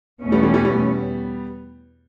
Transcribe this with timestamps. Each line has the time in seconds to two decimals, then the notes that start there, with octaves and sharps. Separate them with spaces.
0.21 E2 B2 A3 C#4
0.32 G3 B3
0.43 E3 G3
0.54 E3 G3
0.65 G3 B3